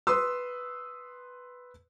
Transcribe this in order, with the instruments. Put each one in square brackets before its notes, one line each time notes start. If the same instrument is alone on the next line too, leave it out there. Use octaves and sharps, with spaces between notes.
[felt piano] B4 C6 D#6 E6